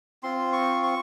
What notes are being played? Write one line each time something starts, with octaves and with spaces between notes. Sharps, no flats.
C4 F4 C6
C#6
C#6